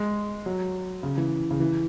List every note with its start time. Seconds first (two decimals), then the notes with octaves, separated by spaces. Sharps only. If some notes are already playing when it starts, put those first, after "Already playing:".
Already playing: G#3
0.46 F#3
1.03 C#3
1.18 E3
1.51 C#3
1.60 E3